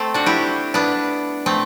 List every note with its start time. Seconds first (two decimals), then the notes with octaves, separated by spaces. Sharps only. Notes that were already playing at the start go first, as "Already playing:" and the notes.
Already playing: A3 C4 A4
0.14 D4 F#4
0.26 E4 G4
0.74 B3 D4
1.46 A3 C4